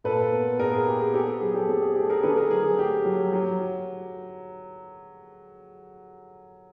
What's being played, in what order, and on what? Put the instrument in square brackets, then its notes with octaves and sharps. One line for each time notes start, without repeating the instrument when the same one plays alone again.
[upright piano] A#2 A4 B4
B3
A#2 G#4 A#4
G#4
B3 G4
G#4
C4 G4 A4
G#4
F#3 G#4
G4 A4
C4 G#4
G#4
A3 G4 A4
G#4 A#4
D3 A4 B4
G#4 A#4
F#3 G#4
G#4
A3 G4
F#3
F#3